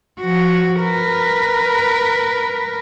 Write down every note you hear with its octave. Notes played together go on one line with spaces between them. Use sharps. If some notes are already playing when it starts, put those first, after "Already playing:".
F3 F#4
A#4 B4